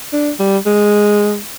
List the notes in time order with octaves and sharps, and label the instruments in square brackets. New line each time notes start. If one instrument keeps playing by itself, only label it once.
[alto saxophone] D4
G3
G#3